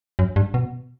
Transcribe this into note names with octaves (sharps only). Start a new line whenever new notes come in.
F#2
G2
B2